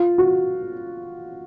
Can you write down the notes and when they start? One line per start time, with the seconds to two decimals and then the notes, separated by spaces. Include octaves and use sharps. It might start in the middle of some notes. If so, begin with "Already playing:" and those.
Already playing: F4
0.18 F#4